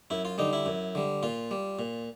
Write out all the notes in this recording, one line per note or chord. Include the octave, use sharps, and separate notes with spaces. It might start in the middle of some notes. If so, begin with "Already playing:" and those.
F#2 E4
F4
D3 G3 D#4
E4
F#2
D3 G3
A#2 F4
G3
A#2